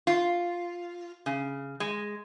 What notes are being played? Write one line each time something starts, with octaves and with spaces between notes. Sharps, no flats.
F4
C#3
G#3